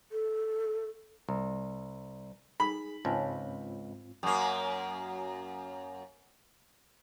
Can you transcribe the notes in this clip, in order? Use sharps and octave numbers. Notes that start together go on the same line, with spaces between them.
A4
C2
D#4 G#4 B5
C#2 G#2 C4 F4 C#5 G#5 A5
F#2 A#3